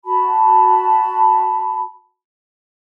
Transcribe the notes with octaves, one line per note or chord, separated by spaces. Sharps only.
F#4 A5 B5